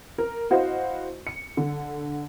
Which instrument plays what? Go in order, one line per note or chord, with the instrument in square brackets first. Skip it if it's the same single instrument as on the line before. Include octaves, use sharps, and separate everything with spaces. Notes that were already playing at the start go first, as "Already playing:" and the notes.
[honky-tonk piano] A#4
E4 F#4 C5 D#5 F5
C#7
D3